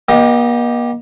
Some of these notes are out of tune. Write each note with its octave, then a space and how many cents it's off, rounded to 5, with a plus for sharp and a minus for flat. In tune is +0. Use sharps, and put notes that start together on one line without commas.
A#3 +45 G4 +0 D#5 +0